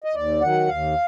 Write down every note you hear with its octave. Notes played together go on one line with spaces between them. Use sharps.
D#5
D#2 D5
D#3 F#3 F#5
D#2 F5